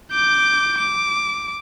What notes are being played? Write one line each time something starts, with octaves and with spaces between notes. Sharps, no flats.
D6 G6
D6